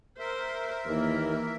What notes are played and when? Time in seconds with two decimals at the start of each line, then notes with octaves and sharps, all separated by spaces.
0.19 A#4 C5 E5
0.86 D#2 E3 A#3